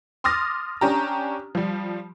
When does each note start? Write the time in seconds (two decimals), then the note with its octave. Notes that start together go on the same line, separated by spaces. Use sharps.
0.24 C6 D6 D#6 F6 A6 A#6
0.81 C#4 D4 G4 A#5
1.55 F3 G3